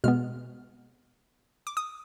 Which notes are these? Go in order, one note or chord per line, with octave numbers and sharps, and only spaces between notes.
B2 G#3 B3 F6
D6
D#6